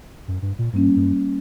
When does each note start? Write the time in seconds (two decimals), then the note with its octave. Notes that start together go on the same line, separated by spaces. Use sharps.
0.28 F#2
0.42 G2
0.58 A#2
0.73 G2 G3 A#3 C#4
0.96 F#2